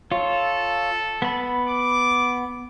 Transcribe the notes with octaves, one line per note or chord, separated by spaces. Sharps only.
F4 A4 C#5
B3 B5
D6